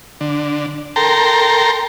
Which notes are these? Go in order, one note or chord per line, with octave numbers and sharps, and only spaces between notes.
D3
A4 A#4 G5 A#5 C6